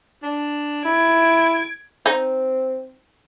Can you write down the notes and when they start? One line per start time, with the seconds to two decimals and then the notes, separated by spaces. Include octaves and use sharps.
0.23 D4
0.85 E4 G#6 D7
2.06 C4 D#4